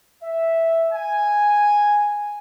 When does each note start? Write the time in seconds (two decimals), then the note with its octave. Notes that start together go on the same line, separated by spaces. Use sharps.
0.22 E5
0.93 G#5